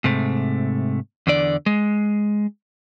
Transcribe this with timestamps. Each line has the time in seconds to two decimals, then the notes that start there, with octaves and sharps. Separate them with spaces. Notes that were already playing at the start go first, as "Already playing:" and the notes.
0.04 G#2 C3 A3
1.27 E2 D3 D5
1.66 G#3